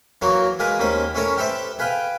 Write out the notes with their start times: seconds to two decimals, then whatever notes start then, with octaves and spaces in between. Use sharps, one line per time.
0.22 E3 F#3 A#3 F#4 C#5
0.59 G#3 F4 G#4 A#4 B4
0.79 D#2 D#3 C#4 C5 B5
1.15 C#4 E4 A4 A#4 C#5
1.37 G4 A4 B4 C5 E5
1.79 G#4 B4 F5 G5